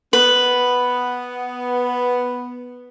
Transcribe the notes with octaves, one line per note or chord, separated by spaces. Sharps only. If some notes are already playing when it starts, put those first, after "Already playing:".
B3 B4